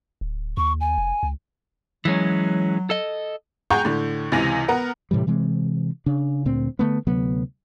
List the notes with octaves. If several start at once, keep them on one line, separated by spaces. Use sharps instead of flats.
D1
D#2 C#6
G#5
F1
C#2
E3 F#3 G#3 C#4
A4 D#5
G#4 F#5 G5 A#5 C#6 G6
A2 D3
C#2 C3 E3 G#5 A#6 F7
B3 A#4 F#5
A2 C3 E3 G3
C3 E3 G#3 C4
C#3 D4
D2 A#2 C4
D3 A3 B3
D2 C3 F#3 B3